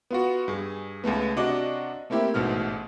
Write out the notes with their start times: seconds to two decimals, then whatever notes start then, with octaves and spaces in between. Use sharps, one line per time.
0.11 B3 F4 F#4
0.48 G2 G#4
1.04 C#2 G#3 A3 B3
1.36 C3 D4 F#4 D#5 D6
2.10 A3 A#3 C4 E4 G4
2.34 A1 G#2 B2 A3 F6